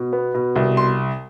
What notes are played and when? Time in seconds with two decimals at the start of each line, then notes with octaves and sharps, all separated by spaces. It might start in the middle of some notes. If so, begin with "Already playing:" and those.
Already playing: B2
0.13 B3
0.34 B2
0.56 C2
0.77 C6